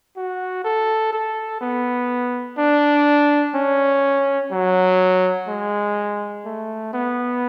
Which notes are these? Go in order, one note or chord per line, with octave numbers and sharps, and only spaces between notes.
F#4
A4
A4
B3
D4
C#4
F#3
G#3
A3
B3